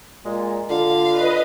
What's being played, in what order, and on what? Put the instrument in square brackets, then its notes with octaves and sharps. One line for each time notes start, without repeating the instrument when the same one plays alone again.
[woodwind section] A#2 G#3
[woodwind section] D3 [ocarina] F4 [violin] F5
[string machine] B4 D#5